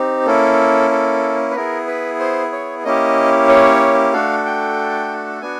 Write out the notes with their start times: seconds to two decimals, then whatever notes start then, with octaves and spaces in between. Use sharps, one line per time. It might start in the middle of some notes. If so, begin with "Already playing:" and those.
Already playing: C4 D#4 G4
0.26 A#3 C#4 E4 A4
0.91 A4
1.51 B4
1.55 B3 E4 G#4 A#4
1.87 B4
2.20 C5
2.52 C#5
2.84 A#3 C#4 E4 G4 D#5
3.49 C#5
4.13 A3 D4 F#4 A4 F5
4.46 G5
5.41 B3 D4 F#4 G#5